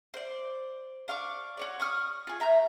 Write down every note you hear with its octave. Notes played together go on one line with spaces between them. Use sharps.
C5 D5
D4 F5 C#6 D6
F#4 C#5 D5
C#6 D#6 F6
F4 G#4
E5 A#5 B5 G6